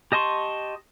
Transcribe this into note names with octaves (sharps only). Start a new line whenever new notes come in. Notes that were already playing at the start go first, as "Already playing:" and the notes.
G4 D#5 A5 C6 C#6